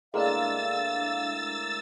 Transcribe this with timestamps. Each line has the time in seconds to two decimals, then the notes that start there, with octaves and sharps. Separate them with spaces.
0.14 A2 G#3 A#3 D4 F5 C6 E6 A6